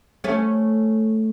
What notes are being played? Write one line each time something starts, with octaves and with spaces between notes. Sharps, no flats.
A3 C#4